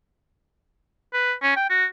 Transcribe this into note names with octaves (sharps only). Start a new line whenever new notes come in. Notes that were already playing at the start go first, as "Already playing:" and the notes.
B4
C#4
G5
F#4